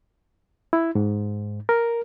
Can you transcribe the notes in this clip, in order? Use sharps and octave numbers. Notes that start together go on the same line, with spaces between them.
E4
G#2
A#4